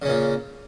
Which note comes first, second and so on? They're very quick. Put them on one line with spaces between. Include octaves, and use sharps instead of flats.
C#3 C#4 A#2